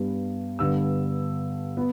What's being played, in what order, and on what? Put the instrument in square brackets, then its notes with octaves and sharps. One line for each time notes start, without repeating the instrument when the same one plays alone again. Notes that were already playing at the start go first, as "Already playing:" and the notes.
Already playing: [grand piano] G2 G3 B3
G2 D3 B3 E6
B3